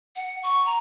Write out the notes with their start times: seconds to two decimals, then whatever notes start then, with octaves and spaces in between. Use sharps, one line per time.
0.16 F#5
0.43 C#6
0.66 A#5